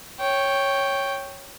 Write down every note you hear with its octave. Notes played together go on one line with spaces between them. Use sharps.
C#5 G5